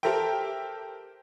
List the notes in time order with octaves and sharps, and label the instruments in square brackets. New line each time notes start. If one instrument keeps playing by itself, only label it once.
[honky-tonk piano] G4 A4 A#4 C5 E5 G5